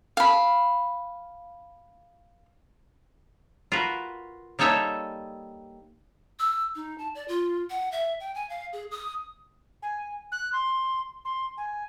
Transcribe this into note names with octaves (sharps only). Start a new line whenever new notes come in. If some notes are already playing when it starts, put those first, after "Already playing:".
F5 B5
F4 F#4 A#4 B4
G3 A#3 D#4 A4 C#5 E5
E6
D#4
A5
D5
F4
F#5
E5
G5
G#5
F5
G#4
D#6
G#5
F#6
C6
C6
G#5